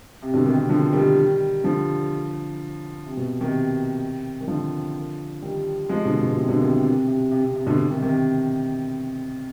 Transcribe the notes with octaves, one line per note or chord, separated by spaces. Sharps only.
C3
B2 D3
C3 D#3
C3
D3 F3
D#3 G3
D3 F3
C3
B2
C3 D#3
D#3
D3 F3
D#3 G3
F3 G#3
B2 D3
B2
B2
C3
B2 D3
C3 D#3
C3
C3
C3
C3
C3
C3
B2 D3
C3 D#3
C3 D#3